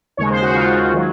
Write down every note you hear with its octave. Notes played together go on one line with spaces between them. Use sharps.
D#2 C#3 G#3 C#5
C5
F#4
D#2 C#3 G#3 F4
D#3 F#3